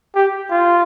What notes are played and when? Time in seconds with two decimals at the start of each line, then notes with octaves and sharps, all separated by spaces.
0.16 G4
0.50 F4